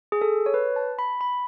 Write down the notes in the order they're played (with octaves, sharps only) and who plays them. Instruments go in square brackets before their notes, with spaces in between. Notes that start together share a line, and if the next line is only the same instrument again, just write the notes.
[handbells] G#4
A4
C#5
B4
A5
B5
B5